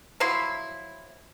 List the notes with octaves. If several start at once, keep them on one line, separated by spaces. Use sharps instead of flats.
F3 F#3 E4 C6